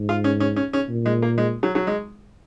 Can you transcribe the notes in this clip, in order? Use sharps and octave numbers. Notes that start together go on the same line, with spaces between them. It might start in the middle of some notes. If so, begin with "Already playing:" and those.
Already playing: G#2
F4
C#4
C#4
C#4
C#4
A#2
G#3
A#3
G#3
F#3
F#3
G#3